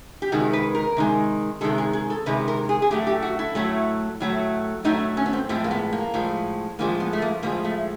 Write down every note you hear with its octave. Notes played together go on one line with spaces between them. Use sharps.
G4
C3 D#3 G#3 F#4
B4
A#4
C3 D#3 G#3
C3 D#3 G#3 A4
G#4
G#4
A4
C3 D#3 G#3 B4
A#4
G#4
G#4
A2 F#3 A3 G4
G4
F#4
E4
A2 F#3 A3
A2 F#3 A3
A2 F#3 A3 D#4
C#4
B3
C4
A2 F3 G#3 C4
A#3
B3
A#3
A2 F3 G#3
A2 F3 G#3 A#3
B3
A3
A#3
A2 F3 G#3 A#3
A3